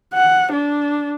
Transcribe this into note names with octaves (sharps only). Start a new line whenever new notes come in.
F#5
D4